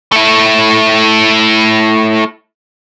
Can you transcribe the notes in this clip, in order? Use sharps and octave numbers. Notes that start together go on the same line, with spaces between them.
A3 E4